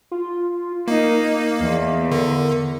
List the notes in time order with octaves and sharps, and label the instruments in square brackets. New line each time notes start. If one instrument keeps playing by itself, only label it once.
[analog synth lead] F4
[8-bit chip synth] A#3 [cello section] D#4 [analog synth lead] A#4
[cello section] E2 [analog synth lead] F5
[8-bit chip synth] D3 [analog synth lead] A#4